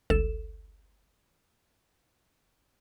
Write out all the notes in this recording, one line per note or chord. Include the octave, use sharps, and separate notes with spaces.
G1 C#2 A4 E7